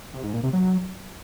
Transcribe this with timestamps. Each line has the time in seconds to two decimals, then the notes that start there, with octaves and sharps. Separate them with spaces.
0.14 C3
0.24 G#2
0.33 A#2
0.43 C3
0.53 F#3